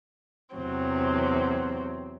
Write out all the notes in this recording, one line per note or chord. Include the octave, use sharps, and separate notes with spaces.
E2 C3 F#3 C4